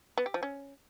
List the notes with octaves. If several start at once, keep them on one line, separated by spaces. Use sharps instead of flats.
B3
G4
F3
C#4